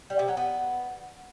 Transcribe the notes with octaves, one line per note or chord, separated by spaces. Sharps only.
G3
C3
F#3
B3